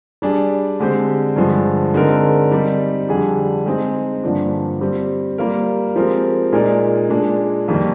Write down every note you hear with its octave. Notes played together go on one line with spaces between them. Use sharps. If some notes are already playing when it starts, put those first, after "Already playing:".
G3 D4 G#4 D5
D3 G#3 C4 G4 C5
G2 D3 F3 G#3
D3 G#3 C4 D#4 A#4
G3 C4 D#4 G4
F2 D3 G3 D4 G#4
G#3 C4 D#4 G#4 D#5
G2 D3 F3 A#3 D4
G3 C4 G4
G3 A#3 F4 A#4
F3 G#3 C4 G4 A#4
A#2 G#3 D#4 A#4 D5
A#2 G#3 D4
F2 D#3 G3 A#3